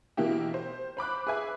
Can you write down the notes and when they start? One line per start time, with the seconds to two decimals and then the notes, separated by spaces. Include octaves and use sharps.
0.17 B2 E3 A#3 E4 G4
0.54 C5
0.97 C5 B5 D6 F#6
1.27 G#4 B4 E5 G#5